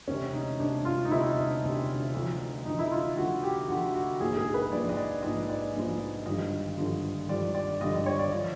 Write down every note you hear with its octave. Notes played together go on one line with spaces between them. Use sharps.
E1 D2 C3 C#4
D#4
E1 D2 C3 D4
F4
D#4
E1 D2 C3 E4
D#4
E1 D2 C3
D2 D3 F3
D2 D3 F3 D#4
E4
F4
D2 D3 F3 F#4
G4
D2 D3 F3 F#4
F#4
A#1 G#2 F3 G#4
G#4
B4
A#1 G#2 F3 D5
D#5
D5
A#1 G#2 F3 D#5
D5
A#1 G#2 F3
G#1 G2 D3 F3 D#5
G#1 G2 D3 F3
G#1 G2 D3 F3 D5
D5
G#1 G2 D3 F3 D#5
D5
C#5
D5
D3 F3 D5